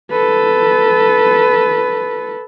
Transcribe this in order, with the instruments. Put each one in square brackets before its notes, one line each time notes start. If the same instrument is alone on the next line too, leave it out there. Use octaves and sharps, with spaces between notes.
[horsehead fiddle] A4 B4